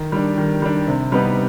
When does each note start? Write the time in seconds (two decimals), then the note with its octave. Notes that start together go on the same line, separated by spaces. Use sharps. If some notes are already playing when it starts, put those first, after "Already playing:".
Already playing: D#3
0.12 G3 D4
0.37 D#3
0.62 G3 D4
0.87 C3
1.12 G3 B3 D#4 B4